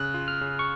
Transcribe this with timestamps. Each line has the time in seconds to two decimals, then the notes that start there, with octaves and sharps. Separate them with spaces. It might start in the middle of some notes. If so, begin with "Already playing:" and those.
Already playing: C#3 F#6
0.14 F4
0.28 F6
0.41 C#3
0.59 C#6